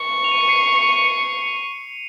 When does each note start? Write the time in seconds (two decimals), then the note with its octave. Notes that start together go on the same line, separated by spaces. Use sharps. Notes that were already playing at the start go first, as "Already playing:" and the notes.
Already playing: C#6
0.24 F7
0.31 D#7
0.41 C#7
0.48 C7 D#7
0.92 C#7 F7